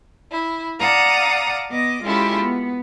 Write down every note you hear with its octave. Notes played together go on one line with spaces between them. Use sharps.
E4
D5 F5 F#5 A5 A#5 D#6
B3 D#5 D6
G#3 C#4 E4 F4 G4 A4
B3